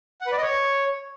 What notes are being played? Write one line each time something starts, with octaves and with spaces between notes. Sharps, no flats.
F#5
B4
D5
D#5
C#5